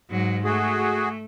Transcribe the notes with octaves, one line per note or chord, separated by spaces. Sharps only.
G#2 F#3
A3 F#4 G#4